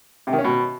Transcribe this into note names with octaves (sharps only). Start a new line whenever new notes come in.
C3
D#3
C#4
B2